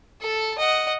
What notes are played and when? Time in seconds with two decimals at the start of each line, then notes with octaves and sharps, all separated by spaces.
0.21 A4 A5
0.58 D#5 F#5